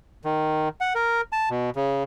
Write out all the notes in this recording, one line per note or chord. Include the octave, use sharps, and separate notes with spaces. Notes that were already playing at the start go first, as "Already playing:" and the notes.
D#3
F#5
A#4
A5
B2
C#3